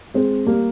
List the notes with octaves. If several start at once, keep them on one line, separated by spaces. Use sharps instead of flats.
G#3 C4
G3 A#3